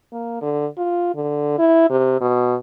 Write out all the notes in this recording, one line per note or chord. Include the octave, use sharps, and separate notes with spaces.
A#3
D3
F4
D3
E4
C3
B2